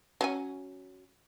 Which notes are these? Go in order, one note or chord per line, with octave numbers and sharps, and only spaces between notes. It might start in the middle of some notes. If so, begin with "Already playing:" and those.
F#3 C#4 G#5